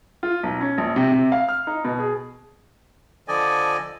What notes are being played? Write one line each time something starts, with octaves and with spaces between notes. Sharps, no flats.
F4
B1
C#4
A#1
C3
C3
F5
F6
D#4
B2
G#4
D3 F3 A4 D5 D#5 G#5